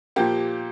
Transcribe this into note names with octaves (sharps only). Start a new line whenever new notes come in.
A#2 F3 A#3 G4 G5